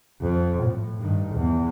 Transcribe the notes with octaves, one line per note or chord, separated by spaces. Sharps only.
F2
A2
G2 D#3
E2